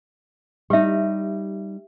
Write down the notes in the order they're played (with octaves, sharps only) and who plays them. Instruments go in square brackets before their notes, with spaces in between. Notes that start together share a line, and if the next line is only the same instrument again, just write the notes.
[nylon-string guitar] G3 D#4 [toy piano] G4 E5